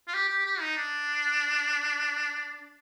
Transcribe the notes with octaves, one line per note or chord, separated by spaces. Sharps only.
F4
G4
G4
G4
D#4
D4